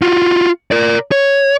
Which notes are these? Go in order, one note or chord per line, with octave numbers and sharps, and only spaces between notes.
F4 F#4
A#4 D5
C#5